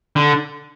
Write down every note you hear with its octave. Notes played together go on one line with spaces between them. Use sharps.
D3